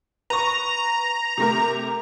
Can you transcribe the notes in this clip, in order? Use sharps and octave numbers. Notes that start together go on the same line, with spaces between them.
B4 A#5 C#6
C3 A3 A#4